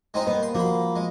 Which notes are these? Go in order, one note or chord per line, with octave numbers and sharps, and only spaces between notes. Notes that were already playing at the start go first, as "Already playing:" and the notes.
G#3 C4 D#4
G3 A#3 B3 C5
C6
F3 A#3 F#4 B5
G#3